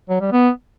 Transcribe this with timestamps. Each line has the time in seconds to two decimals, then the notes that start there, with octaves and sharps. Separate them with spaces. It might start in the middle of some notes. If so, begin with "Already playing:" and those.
0.09 F#3
0.21 G3
0.32 B3